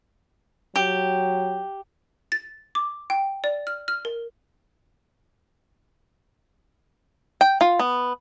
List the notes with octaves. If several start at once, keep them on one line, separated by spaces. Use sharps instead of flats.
F#3 G4
A6
D6
G5
D5
F6
F6
A#4
G5
F4
B3